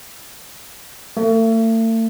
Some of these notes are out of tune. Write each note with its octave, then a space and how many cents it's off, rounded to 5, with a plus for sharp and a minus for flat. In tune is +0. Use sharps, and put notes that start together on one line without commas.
A3 +40